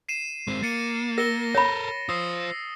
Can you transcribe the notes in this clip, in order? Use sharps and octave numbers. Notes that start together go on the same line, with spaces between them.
C7 D#7 E7
G#3 C4
A#3 A6 C#7 D#7
A#4 A#6 C#7 G7
A4 A#4 C#5 B5
F4 C5 D#6 E6 C7